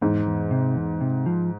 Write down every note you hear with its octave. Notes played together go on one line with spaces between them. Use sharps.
E2 G#2
E2
C3
E2
C3
F3